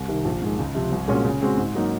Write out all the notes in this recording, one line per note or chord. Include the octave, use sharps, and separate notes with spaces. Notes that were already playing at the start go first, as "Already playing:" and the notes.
Already playing: C2
C3 D#3
A#1
G#2 D#3 G#3
C#2
C3 F3
C2
A#2 G#3 C#4 F#4
C#3
G#3 C4 F#4
G#2
F#3 A#3 D#4